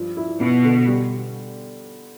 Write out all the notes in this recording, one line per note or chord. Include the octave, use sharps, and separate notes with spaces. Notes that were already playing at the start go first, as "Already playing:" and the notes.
Already playing: G2 F3
E4
B2 B3
D3
G3